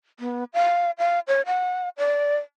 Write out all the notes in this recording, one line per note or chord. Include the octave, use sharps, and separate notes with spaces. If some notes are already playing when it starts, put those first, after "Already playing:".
B3
F5
F5
C#5
F#5
D5